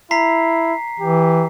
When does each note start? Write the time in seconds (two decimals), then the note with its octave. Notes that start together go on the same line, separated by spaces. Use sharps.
0.11 E4 A#5 B6 C7
1.00 E3 G4